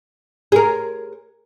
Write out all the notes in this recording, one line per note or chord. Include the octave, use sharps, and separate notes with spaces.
G#4 A#4